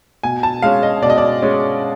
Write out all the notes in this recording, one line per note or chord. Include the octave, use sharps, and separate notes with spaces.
B2 G#5
A5
G#3 C#4 F5
D#5
B2 D5
D#5
D5
G#3 C#4